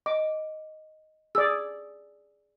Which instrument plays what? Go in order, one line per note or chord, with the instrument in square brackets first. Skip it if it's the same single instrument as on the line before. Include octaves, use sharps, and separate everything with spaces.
[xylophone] D#5 [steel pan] D6
[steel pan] G#4 D5 [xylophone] E6